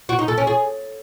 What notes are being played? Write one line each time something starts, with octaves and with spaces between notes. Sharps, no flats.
F#4
D#4
A4
C#4
G#4